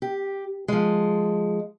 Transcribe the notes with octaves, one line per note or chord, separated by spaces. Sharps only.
G4
F3 G#3